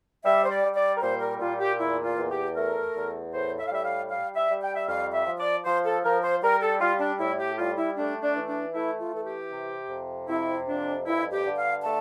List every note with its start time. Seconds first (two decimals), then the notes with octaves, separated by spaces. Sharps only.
0.24 G3 E5
0.45 C5
0.51 D5
0.64 G3
0.75 D5
0.97 A#4
1.01 A#2 C5
1.21 A#4
1.40 A#2 F4
1.60 G4
1.79 E2 E4
2.04 F4
2.17 E2
2.31 G4
2.56 A3 A#4
2.95 E2
3.34 A2 C5
3.59 E5
3.67 F5
3.72 G3 E5
3.85 F5
4.11 G3 F5
4.36 E5
4.49 G3
4.62 G5
4.76 E5
4.88 F2 F5
5.13 E5
5.27 F3
5.39 D5
5.65 F3 C5
5.85 A4
6.04 F3 A#4
6.23 C5
6.42 G3 A#4
6.62 A4
6.81 G3 F4
7.00 D4
7.20 A2 E4
7.40 G4
7.58 G3 F4
7.78 E4
7.97 A3 D4
8.22 D4
8.36 E3
8.48 D4
8.74 A3 E4
9.00 F4
9.13 E3 A4
9.26 G4
9.52 C3
9.90 F2
10.29 C3 E4
10.67 F2 D4
11.06 G2 E4
11.32 G4
11.45 D3
11.58 F5
11.83 A3 A5